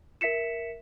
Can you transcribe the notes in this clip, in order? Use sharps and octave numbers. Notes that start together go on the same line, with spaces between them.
A#4 E5 B6 C#7 E7